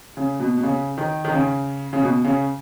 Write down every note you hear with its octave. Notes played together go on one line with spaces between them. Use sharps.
C#3
B2
B2
C#3
D#3
D#3
C#3
C#3
B2
C#3